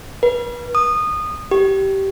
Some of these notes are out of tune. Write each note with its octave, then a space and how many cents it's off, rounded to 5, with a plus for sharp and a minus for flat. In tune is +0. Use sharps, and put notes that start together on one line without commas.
B4 -35
D#6 -20
G4 -15